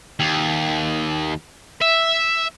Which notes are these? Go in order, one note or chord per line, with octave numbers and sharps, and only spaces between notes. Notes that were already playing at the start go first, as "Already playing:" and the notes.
D#2
E5